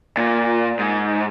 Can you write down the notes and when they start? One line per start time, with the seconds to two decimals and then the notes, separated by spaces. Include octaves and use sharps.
0.17 A#2
0.79 G#2